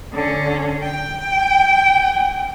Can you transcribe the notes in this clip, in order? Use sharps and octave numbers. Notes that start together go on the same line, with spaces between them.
D3 C#4
G5